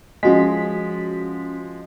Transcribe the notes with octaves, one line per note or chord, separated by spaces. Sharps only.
F3 G#3 C#4 F#4 B6